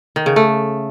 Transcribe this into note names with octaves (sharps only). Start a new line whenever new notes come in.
D#3
C#3
A3